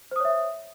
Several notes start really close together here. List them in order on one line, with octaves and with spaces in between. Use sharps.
C5 D#6 C#5 E5